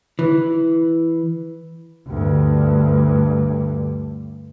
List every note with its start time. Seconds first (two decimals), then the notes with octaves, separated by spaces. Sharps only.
0.19 E3
2.07 D2 G2